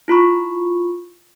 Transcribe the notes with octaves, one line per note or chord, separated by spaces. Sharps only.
E4 F4 B5 C#6